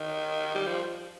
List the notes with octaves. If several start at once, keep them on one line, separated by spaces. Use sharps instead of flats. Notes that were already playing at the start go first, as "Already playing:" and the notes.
Already playing: D#3
G3
F3